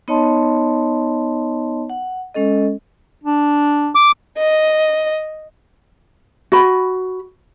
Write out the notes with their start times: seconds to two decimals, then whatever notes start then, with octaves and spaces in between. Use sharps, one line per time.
0.08 B3 D#4 C#5 D#5 A5 C6
1.90 F#5
2.35 G#3 C#4 A4 D#5
3.24 D4
3.95 D6
4.38 D#5
6.52 F#4 B5